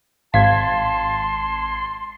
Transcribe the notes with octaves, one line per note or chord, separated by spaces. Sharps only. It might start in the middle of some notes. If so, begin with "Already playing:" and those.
G#1 F5 A5 C6 G#6